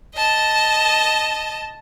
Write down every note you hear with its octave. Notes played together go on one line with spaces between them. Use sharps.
D#5 A5